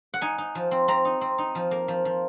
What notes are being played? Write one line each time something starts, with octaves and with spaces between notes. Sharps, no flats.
F#5
D#4 G#5
D#4
F3
C4
C4 A#5
D#4
C4
D#4
F3
A#3
F3
F3